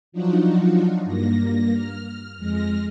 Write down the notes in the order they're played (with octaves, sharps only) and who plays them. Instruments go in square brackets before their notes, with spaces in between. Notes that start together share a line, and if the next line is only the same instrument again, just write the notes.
[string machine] F3 F#3 D4 D#4 F4 F#4
G2 A#3 A#6
F6
F2 G#3 F6 A#6